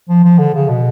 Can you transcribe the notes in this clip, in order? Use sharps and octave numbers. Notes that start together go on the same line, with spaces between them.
F3
F3
D3
C#3
B2